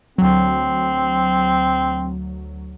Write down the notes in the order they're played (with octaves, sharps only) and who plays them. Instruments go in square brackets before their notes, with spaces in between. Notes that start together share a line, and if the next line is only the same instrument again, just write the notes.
[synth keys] D2 F#3 [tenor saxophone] C4